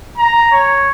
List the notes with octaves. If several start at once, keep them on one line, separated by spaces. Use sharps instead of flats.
A#5
C#5